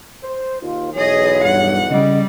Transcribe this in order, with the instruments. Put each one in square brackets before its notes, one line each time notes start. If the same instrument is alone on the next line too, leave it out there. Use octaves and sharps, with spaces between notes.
[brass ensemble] C5
[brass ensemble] D#2 [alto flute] F4
[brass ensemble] B1 E2 [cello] G#4 D#5 [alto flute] C#5
[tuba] G2 [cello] F#5
[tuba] C#3 [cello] G3 [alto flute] D#5